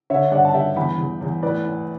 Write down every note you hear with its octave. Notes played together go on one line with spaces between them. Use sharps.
D3 C#5 E5
G2 D5 F#5
A5
G2 E5 G5
E2 G5 B5
E2
E2
A2 B4 D5
A2